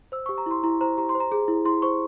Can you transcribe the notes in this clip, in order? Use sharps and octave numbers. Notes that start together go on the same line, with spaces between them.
C5 E6
G4 C#6
A#5
E4 C6
E4 A#5
C5 A#5
G4 A#5
C6
C5
A#5
G#4
E4
E4 C6
C5 C#6